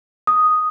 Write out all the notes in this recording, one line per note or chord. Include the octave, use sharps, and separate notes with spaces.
D#6